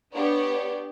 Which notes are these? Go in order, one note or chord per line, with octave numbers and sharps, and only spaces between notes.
B3 D4 G4 C#5